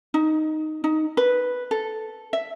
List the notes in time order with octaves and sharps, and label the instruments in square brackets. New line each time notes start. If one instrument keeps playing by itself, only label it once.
[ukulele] D#4
D#4
B4
A4
E5